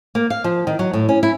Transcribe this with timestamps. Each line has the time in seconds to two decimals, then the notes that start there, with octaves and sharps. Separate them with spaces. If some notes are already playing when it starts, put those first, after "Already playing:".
0.15 A#3
0.30 F5
0.44 F3
0.67 D#3
0.79 F#3
0.93 A2
1.09 C#4
1.23 E4